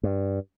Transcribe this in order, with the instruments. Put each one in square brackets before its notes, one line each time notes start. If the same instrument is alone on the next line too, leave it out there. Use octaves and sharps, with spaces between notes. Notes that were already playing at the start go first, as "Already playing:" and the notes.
[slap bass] G2